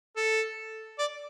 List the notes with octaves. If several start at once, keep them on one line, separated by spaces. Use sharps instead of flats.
A4
D5